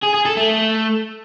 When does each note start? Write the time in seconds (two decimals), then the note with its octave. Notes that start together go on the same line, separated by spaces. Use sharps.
0.03 G#4
0.14 G#4
0.26 A4
0.37 A3